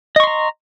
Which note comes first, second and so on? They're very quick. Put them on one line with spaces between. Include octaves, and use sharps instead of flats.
D#5 C#6 C6 A#5